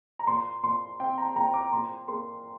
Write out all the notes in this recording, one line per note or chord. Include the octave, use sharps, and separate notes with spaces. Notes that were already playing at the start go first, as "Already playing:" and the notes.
A#5
A#2 C6
A#2 C6
C4 G5
A#5
A#2 A#5
D6
A#2 C6
A#3 C6